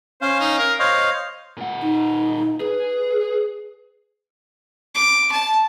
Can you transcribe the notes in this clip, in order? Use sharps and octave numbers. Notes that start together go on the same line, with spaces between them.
C#4 C5 F5
D#4
A#4
C5 C#5 D#5 F5
A#2 F#5
D#4
G#4 B4
D6
A5